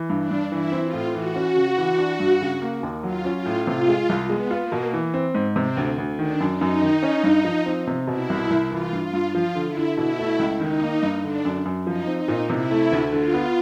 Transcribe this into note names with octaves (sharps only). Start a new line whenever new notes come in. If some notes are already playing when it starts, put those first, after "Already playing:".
Already playing: E3
G2
D4
G2
E3 E4
C4
F4
A2
E3 F#4
C#4
C#3
E3
D4
G2
C#3
A#3
D#2
F#3 F4
C#4
F4
A2
C3 F4
G#3
C2
G#3 B3
F4
A#3
B2
E3
C4
G#2
C3 C4
D2
D2
D#3 D4
F#2
D#4
F#2
D#3
C#4
G2
F3
C4
C3
B2 E4
C2
C2
E3 F4
G2
F4
G2
F3 F4
D3
E4
D3
B2 E4
A3
C#2
D#3 D#4
A#3
G2
D3 D4
F#2
F#2
F3 D#4
C4
D#4
A#2
C3 E4
A3
D2
D3 F4
B3